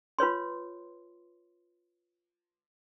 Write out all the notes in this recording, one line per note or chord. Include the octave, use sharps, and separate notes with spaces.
F4 B4 C#5 C6